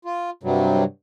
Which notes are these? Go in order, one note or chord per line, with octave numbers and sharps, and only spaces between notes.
F4
G2 C3 F#3 G3